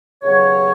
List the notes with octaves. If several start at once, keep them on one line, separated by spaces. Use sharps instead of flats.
D#2 C#3 F#3 B3 C#5